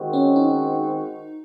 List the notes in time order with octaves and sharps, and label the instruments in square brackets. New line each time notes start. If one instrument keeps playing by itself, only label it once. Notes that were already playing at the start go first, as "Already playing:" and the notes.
Already playing: [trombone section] D#3 G#3 C4 F#4
[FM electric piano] C#4
D#4